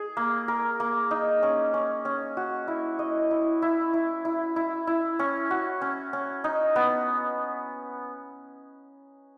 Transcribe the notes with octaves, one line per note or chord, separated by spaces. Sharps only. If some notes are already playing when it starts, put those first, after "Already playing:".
Already playing: G#4
A#3
A#4
A#3
D#4
C#4
C#4
C#4
F#4
E4
D#5
E4
E4
E4
E4
E4
E4
C#4
F#4
C#4
C#4
D#4
B3